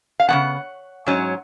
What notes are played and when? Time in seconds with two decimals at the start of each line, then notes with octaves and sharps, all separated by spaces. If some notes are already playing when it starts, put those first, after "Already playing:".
0.20 F5
0.28 C#3 F3 B3 F#5
1.06 G#2 F#3 C#4